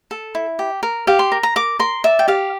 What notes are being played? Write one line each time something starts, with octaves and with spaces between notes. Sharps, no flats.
A4
E4
G4
A#4
G4 F5
C6
A#4
A#5
A#4 D6
A#4 C6
D5 E5
G5
G4 F5